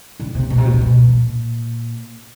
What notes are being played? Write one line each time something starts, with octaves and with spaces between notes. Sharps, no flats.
D3
C3
B2
C3
B2
C3
B2
A#2